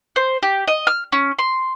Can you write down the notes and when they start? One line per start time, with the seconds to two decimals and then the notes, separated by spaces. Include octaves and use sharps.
0.16 C5
0.43 G4
0.68 D#5
0.87 F6
1.12 C#4
1.39 C6